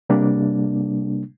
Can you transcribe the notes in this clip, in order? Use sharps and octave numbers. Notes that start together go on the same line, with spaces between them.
C3 G3 A#3 D4